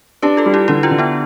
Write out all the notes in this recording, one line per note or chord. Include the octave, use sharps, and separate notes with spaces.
D4 G4 B4
F4 A4
G3
E4 G4
D3 E4 G4
D4 F4
D3
B3 D4